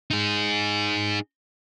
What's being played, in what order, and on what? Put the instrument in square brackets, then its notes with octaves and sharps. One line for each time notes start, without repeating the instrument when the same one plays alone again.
[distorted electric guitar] D#4 G#4